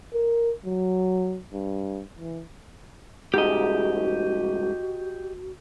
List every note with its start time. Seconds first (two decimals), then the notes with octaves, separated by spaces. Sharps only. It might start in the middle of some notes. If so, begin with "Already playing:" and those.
0.13 A#4
0.66 F#3
1.53 G2
2.19 E3
3.34 C2 G#2 F#4 G4 D#5